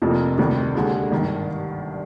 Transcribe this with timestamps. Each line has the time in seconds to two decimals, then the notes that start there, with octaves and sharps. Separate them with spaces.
0.02 F1 F2 C3 F3 A#3
0.38 D2 C3 D#3 G3 D4
0.75 D#2 D3 G#3
1.11 G#1 G2 D#3